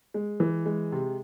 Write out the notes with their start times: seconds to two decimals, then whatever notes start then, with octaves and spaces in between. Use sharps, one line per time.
0.14 G#3
0.40 E3
0.66 G#3
0.92 C3